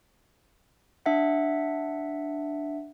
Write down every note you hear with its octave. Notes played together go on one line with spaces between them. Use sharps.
D4 E5 F#5